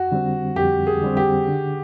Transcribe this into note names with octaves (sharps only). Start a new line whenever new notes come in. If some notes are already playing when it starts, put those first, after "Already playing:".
Already playing: F2 F#4
D3 G3 C4
F2 G4
G#4
D3 G3 C4
G4
D3